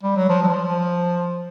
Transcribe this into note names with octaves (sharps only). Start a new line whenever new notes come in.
G3
F#3
F3
F#3
F3